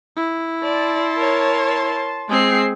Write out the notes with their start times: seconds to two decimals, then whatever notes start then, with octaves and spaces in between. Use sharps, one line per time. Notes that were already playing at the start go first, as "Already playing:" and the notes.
0.17 E4
0.63 D5 A5 C6
1.18 A#4 C#5
2.29 G#3 C4 G#4 C7